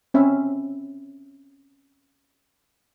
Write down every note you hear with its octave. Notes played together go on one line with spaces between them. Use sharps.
C4 C#4 E5